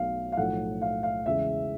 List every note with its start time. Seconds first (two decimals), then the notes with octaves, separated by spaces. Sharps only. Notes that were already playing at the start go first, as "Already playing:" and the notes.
Already playing: B1 B2 F#3 A3 F5
0.32 F5
0.37 B1 A2 F3 A3 F#5
0.82 F5
1.03 F5
1.25 E2 C#3 E3 G#3 E5